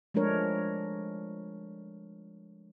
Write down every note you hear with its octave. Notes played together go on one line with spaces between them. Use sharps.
F3 G#3 A3 D4 A#4 C#5